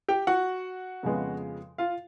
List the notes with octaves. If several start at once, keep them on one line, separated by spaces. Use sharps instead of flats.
G4 G5
F#4 F#5
F2 C#3 F3 G#3 B3
F4 F5